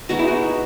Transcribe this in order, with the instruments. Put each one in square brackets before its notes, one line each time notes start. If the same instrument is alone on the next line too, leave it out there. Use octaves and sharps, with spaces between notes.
[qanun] G#3 B3 D#4 [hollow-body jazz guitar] F#4
[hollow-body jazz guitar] E4
F#4